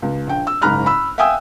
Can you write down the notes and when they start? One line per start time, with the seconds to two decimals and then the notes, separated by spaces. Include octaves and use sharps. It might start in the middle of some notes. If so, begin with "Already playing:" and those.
0.02 C#2
0.27 A#1 G5
0.47 E6
0.62 F#1 G#2 A#5 B5 F6 F#6
0.86 B5 E6
1.18 E5 F5 G5 G#5 D#6 E6